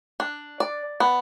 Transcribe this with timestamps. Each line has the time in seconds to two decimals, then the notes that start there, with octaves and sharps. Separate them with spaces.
0.20 D4
0.60 D5
1.00 B3